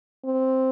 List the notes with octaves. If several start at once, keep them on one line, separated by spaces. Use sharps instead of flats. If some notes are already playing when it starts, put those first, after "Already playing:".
C4